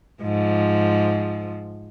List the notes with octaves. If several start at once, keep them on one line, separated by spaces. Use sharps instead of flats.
G#2 F3